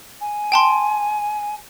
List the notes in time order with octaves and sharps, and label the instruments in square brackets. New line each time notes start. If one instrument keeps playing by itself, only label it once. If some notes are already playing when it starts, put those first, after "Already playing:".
[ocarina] G#5
[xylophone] G5 A5 C6